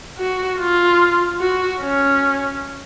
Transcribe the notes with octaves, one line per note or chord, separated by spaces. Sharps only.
F#4
F4
F#4
C#4